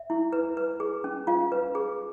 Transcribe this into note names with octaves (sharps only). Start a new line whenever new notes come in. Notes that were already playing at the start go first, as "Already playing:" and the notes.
Already playing: E5
E4
B4
B4
G#4
C#4
F4 F5
B4
G#4